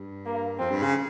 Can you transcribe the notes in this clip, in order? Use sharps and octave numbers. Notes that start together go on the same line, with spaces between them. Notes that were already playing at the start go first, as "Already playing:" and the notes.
Already playing: G2
A#3
F2 C4
G2
C#3